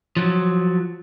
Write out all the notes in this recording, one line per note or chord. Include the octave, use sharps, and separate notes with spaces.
F3 F#3